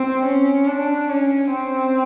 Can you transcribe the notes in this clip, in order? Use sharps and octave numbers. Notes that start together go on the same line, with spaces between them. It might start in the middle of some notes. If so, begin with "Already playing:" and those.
Already playing: C4
C#4
D4
C#4
C4